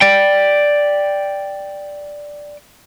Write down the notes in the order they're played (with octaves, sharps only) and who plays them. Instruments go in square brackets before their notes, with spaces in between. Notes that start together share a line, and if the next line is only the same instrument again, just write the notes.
[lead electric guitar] D5 G5